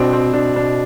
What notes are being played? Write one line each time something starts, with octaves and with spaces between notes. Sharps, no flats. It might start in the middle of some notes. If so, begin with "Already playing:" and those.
Already playing: B2 C4 D4
C4
B2 D4
D4